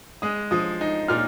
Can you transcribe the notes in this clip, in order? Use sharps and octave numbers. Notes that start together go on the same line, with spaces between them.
G#3 D#6
F3 D#6
D#4
A#2 F6